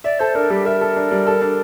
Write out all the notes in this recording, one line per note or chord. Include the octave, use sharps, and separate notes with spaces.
D5 E5
A4 C5
D4 A#4
G3 G4
A#4 E5
A4
D4
G3
A4
D4